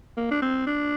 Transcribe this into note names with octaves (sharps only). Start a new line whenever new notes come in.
A#3
D4
C4
D4